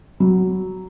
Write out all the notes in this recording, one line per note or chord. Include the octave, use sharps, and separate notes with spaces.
F#3